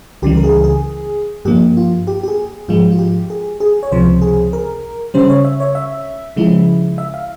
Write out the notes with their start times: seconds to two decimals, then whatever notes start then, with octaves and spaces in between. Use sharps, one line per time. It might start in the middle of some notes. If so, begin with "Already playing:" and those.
0.22 C#2 C#3 E3 G3 G4
0.37 A#4
0.44 G#4
0.64 G#4
1.45 G2 F3 A#3 G4
1.77 F4
2.07 G4
2.23 G4
2.28 G#4
2.68 G#2 F3 G#3 F4
2.91 F4
2.99 G4
3.30 G#4
3.60 G#4
3.83 C#5
3.92 C#2 C3 F3 C5
4.22 G#4
4.53 A#4
5.14 C#3 G3 C#4 C5
5.30 C#5
5.45 E5
5.60 C#5
5.75 E5
6.36 C#3 F3 G#3 E4
6.98 E5
7.14 F5